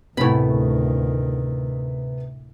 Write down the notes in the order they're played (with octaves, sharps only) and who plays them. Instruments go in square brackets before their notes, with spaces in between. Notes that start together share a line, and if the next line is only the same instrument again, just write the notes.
[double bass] D2 D#3 [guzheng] A2 B5 [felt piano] C3 B3